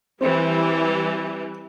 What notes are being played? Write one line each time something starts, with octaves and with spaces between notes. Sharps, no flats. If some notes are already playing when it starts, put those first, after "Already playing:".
E3 G3 C4 G4